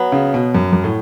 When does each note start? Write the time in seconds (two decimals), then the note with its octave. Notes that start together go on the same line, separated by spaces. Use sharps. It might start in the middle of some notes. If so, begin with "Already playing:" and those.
Already playing: F#3 B3
0.12 C#3
0.34 B2
0.54 F#2
0.73 F#2
0.84 A2